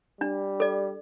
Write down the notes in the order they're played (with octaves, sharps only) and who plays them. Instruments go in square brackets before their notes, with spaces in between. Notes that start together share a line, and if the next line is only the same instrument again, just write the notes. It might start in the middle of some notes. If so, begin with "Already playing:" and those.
[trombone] G3 [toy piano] D4
[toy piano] A4 D5